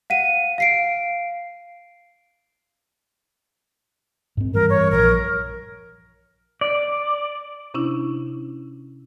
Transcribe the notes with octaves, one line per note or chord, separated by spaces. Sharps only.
F5 F#5 D#7
F5 C7 D7
G#2 C4
G2 E3 G3 A#4
C#5
A#1 E3 F3 A#4
D5
C3 C#4 D4 E4